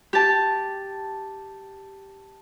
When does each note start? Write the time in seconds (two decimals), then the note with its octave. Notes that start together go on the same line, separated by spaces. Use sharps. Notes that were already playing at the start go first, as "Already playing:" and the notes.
0.13 G4 A5